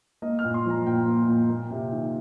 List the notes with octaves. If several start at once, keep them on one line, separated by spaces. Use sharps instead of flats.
A#3 D#5
F6
A#2
C6
F3 A#5
A#2 G5
A#3
A#2
A#3
C3
D#3